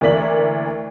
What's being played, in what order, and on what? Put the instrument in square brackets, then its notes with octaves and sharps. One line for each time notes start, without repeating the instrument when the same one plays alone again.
[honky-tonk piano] D2 E3 A#3 D5 B6 F#7